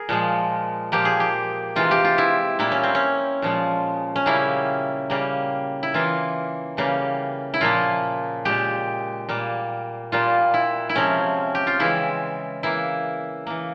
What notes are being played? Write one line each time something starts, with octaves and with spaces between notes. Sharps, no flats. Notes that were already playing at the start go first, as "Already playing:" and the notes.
Already playing: G#4 A#4
A#2 F3 G#3
A#2 F3 A#3 G4
G#4
G4
C3 E3 G#3 F4
G4
F4
E4
A#2 G3 A#3 E4
C#4
C4
C#4
A#2 F3 G#3
C#4
C#3 G3 A#3 E4
C#3 G3 A#3
E4
E3 A#3 F4
C#3 E3 G3 A#3
E4
A#2 F3 A#3 F4
A#2 G#3 G4
A#2 G3 A#3
A#2 G3 A#3 F4
E4
E4
C3 F3 G#3 C#4
G4
F4
C#3 E3 G#3 E4
E3 A#3 E4
E3 A#3